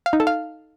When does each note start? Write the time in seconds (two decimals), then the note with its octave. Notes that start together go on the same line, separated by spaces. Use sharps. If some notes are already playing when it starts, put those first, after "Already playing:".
0.06 F5
0.13 D#4
0.20 A4
0.27 F5